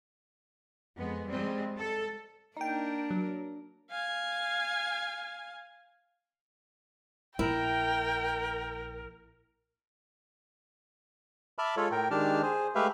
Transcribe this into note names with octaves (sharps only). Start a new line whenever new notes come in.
F2 G#3 B3
G3 G#3 C4
A4
A#3 D4 D#4 A#4 G5
F#3
F5 G#5
A#1 E4 A#4 G5
E5 A5 B5 D6 F6
G#3 F4 A4 C#5
A2 A#4 G5
D#3 G#3 D4 G4 A5 F6
G#4 C5
G#3 A3 G4 B4 E5 F5